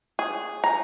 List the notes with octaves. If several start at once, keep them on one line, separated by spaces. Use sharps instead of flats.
G#4
A#5